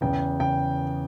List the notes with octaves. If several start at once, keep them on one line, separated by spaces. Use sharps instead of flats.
E2 C#3 E3 G5
C#3 G5